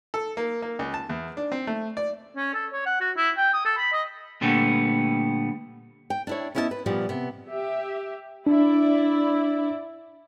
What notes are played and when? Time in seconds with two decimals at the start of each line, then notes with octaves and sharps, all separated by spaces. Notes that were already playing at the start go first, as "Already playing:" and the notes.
0.14 A4
0.37 A#3
0.62 A#3
0.79 C#2
0.94 A5
1.09 E2
1.37 D4
1.52 C4
1.67 A3
1.97 D5
2.36 C#4
2.54 A4
2.73 C#5
2.86 F#5
3.01 F#4
3.17 E4
3.37 G5
3.54 D#6
3.65 A4
3.78 B5
3.93 D#5
4.41 A#2 D3 G3 A3 B3
6.10 G5
6.27 D4 E4 C#5
6.55 B3 C#4 E4 D#5 F5 A5
6.71 B4
6.86 A#2 F3 G3 B3 D5
7.09 C3 B3
7.50 G4 E5
8.47 D4 E4 D5